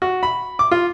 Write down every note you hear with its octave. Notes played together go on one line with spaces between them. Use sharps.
F#4
B5
D6
F4